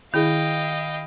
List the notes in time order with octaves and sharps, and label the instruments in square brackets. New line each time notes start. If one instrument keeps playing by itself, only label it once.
[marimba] D#3 [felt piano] E4 G#4 [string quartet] D#5 F5 G5